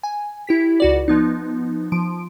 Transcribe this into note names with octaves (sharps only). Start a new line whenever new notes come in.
G#5
E4 G4 B6
C#2 F#4 D5
F3 B3 D#4
F3 D7